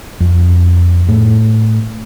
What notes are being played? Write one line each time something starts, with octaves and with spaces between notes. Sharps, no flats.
F2
A2